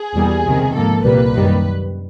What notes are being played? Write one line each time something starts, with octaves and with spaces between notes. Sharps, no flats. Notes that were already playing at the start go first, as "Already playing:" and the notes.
Already playing: G#4
E2 B2 G3 A#3
C#2 C3 D#3
G#2 F3 A#3 A4
C2 A#2 G3 A#3 B4
F#2 D#3 G3 A#3